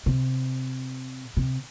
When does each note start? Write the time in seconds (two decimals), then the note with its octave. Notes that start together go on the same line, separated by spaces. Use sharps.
0.06 C3
1.37 C3